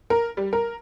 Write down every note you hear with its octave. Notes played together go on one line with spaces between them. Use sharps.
A#4
G3
A#4